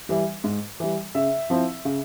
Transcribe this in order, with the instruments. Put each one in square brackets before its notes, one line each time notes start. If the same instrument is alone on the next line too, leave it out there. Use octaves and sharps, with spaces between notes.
[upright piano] E3 G3
G#2
E3 G3
C#3 E5
F3 C4 E4
C#3